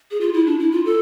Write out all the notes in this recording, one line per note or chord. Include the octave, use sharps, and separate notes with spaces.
G#4
F4
E4
D4
E4
F4
A4